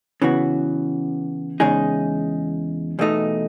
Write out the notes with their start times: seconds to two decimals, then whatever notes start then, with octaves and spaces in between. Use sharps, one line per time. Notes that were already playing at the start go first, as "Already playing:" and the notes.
0.22 C#3 E3 B3 F#4
1.60 E2 C#3 G#3 D#4 G#4
2.99 E2 B2 A3 D#4